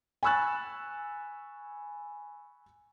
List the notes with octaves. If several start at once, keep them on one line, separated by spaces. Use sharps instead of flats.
G#5 B5 C#6 E6 F#6 A6